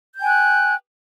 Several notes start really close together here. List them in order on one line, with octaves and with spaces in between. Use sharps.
G6 G5 G#5 F#6